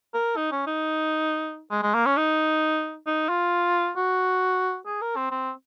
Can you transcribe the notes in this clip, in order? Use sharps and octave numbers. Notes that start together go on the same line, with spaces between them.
A#4
D#4
C#4
D#4
G#3
G#3
A#3
C#4
D#4
D#4
F4
F#4
G#4
A#4
C4
C4